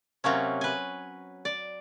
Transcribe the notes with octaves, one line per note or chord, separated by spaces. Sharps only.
C3 F#3 A#3 C#4
B4 G#5
D5